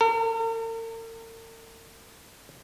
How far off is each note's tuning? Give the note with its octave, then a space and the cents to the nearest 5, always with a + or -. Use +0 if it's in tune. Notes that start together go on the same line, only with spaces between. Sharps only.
A#4 -45